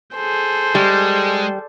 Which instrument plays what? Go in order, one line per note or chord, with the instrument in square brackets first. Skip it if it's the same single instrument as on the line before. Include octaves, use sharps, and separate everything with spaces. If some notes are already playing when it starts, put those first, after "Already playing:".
[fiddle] G#4 A4 [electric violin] C5
[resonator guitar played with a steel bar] G3 [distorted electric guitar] G#3